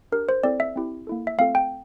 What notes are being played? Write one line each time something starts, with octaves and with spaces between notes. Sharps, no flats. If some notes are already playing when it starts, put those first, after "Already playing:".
D4 G4 A#4
C5
C4 E4 A4 D5
E5
C4 E4 G4
A#3 E4 A4
E5
A3 C4 F4 A4 F5
G5